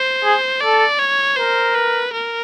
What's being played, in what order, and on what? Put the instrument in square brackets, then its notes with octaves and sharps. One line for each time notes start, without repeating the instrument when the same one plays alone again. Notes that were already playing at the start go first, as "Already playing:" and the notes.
Already playing: [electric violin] C5
[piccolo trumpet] G#4
[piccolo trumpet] A4 [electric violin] D5
[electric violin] C#5
[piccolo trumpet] A#4 [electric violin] C5
[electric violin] B4
A#4